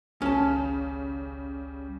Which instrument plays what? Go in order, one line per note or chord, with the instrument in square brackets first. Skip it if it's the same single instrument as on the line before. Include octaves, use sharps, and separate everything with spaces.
[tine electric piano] G#1 C#2 [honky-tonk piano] C#3 [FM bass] G3 [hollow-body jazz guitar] C#4 A5